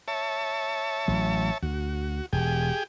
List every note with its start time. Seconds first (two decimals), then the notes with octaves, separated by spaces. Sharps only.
0.08 C#5 E5 A5
1.08 A1 F#3
1.63 D2 F#4
2.33 E1 G4 G#4 G5